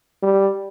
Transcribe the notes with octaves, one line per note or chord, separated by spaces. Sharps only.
G3